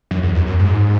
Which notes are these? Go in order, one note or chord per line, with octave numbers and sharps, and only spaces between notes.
F#2
E2
F#2
F#2
G#2